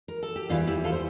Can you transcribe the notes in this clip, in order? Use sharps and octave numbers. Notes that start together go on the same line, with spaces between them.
A#4
A4
G4
E2 E3 G3 D4 F4
E4 G4
F4 A4
C5